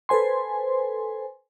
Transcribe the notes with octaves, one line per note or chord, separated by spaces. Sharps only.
A4 B4 C5 G#5 C6